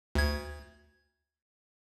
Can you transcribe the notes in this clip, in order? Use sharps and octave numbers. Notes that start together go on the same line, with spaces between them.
D2 G#6